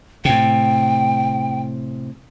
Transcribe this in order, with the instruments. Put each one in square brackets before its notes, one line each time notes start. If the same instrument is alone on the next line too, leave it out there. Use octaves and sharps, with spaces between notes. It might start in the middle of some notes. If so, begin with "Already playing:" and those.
[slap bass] A2 C3 [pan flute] G5